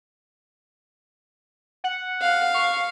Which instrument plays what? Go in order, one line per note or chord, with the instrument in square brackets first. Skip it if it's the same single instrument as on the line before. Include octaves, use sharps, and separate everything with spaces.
[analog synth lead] F#5
[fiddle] F5
[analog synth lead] C#6